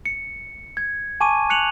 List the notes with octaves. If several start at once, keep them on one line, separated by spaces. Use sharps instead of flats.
C#7
G#6
G#5 A5 C#6 D6 D#7
F#6 C#7 F7 F#7